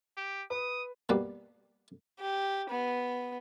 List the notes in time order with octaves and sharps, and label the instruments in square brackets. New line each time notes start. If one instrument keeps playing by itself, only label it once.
[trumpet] G4
[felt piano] B4 [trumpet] D#6
[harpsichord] B2 G3 A#3
[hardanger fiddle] G4
B3